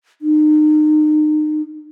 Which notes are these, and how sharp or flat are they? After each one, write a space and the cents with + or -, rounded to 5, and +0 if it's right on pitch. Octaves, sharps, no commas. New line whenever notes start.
D#4 -35